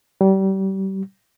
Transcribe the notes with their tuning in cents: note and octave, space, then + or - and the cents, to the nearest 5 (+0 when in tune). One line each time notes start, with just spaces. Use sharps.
G3 -30